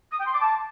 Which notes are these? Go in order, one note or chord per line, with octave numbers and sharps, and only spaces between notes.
D#6
G5
C6
D6
A5